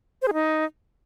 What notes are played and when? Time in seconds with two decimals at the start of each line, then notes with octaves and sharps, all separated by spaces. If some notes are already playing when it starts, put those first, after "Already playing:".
0.22 C5
0.28 G#4
0.33 D#4